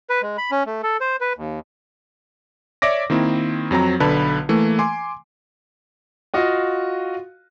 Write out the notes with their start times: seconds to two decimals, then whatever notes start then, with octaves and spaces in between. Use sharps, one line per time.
0.10 B4
0.22 G#3
0.38 B5
0.51 C#4
0.66 A3
0.83 A4
1.01 C5
1.21 B4
1.37 D#2
2.82 C#5 D5 E5 D6 A#6
3.10 D#3 A#3 C4 E4
3.71 F2 F#3 C4 A#5
4.00 B1 D3 B4 A5 B5
4.49 E3 A3 A#3
4.79 G#5 C6 D6
6.34 F4 F#4 D#5 F5